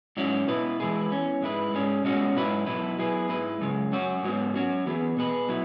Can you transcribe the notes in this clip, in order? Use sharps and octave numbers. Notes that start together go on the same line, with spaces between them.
G#2 F#3 C#4 E4
B2 B3 E4 B4
E3 G#3 E4 G#4 B4
E2 E3 C#4
G#2 G#3 E4 B4
G#2 G#3 C#4
B2 G#3 C#4 F#4
G#2 F#3 E4 B4
B2 F#3 E4 B4
F#3 B3 E4 G#4 B4
G#2 G#3 E4 B4
F#2 C#3 G#3
F#2 F#3 C#4 F#4
G#2 F#3 B3
F#3 C#4 F#4
E3 B3 G#4 B4
B2 B3 G#4 B4
F#3 B3 E4